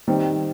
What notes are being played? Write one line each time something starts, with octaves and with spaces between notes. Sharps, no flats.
D#3 G3 C4